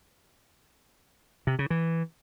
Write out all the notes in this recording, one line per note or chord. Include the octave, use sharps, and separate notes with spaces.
C3
C#3
E3